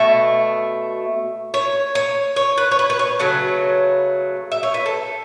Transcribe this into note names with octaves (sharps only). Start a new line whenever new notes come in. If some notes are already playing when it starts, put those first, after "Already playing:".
Already playing: B2 A3 E5
C#5
C#5
C#5
B4
C#5
B4
B4
C#5
C#3 F#3 A3 B4
E5
C#5
B4
A4